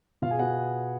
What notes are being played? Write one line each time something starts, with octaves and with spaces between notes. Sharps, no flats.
B2 F4 F5
G#4 G#5
B3 F#4 F#5